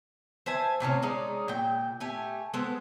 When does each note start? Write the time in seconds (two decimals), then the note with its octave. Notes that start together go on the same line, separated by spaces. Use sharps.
0.46 C5 E5 G#5 A5
0.80 A2 C3 C4 C#4
1.02 G#3 C#4 D#4 D5
1.48 A#2 G5
2.00 A3 G4 G#5
2.53 G#3 B3 A4 C5